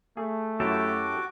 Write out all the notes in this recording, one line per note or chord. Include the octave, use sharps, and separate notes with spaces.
A3 G#4
F#2 E4 F#4 G4 A4 D6